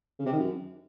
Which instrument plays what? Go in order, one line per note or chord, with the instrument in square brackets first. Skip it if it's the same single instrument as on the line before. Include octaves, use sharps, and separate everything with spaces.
[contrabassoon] C#3
C3
D#3
F#2